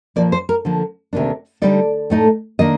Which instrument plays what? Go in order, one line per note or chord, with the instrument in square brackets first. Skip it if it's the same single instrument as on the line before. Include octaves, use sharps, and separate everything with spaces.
[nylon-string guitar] A#2 F3 A#3 D5
C5
A#4
D3 F3 A#3
D2 C3 D#3 A#3 D4
D3 G3 C4 D#4 D5
A2 A3 D#4
D#3 A#3 D4 D#5